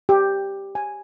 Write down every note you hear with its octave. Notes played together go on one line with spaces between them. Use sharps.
G4
G#5